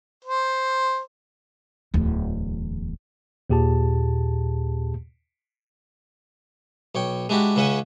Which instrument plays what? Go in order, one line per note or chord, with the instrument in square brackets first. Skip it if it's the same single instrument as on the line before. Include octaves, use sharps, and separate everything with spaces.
[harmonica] C5
[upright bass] D1 E2
[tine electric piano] D#2 A#2 G4 G#4 A5
[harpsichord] B1 C#5 G5
G#3 D4 E4 F#4 G4
C#2 C#3 C#4 E5 F#5 G#5